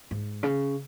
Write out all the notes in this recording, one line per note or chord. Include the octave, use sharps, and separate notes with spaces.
G#2
C#3